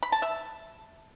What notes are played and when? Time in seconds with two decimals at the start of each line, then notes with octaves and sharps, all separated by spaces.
0.03 B5
0.12 A5
0.22 E5